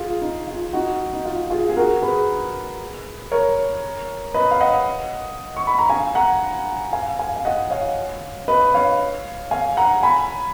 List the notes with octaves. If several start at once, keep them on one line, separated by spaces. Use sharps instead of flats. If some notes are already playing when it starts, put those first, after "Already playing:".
Already playing: F4 G#4
D#4
F4
D#4 F#4
D#4
F4
F4 G#4
G#4
F#4 A#4
G#4 B4
A#4 C#5
B4 D#5
F5
D#5 F#5
C#6
B5
A#5
F5 G#5
F#5 A#5
F5 G#5
F5 G#5
F5
D#5 F#5
C#5 F5
B4 D#5
C#5 F5
F5 G#5
F#5 A#5
G#5 B5